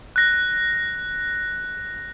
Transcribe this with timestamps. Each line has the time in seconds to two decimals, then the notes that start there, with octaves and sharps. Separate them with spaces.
0.16 F#6 A#6